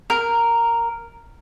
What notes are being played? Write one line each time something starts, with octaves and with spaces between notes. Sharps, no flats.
A#4